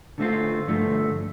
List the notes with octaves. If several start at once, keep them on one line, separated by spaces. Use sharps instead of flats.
D3 A3 C4 F4
G2 D3 F3 A3